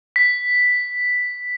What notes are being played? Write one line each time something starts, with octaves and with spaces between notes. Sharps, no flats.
B6